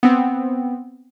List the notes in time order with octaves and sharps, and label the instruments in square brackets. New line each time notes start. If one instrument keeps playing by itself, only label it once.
[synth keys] B3 C4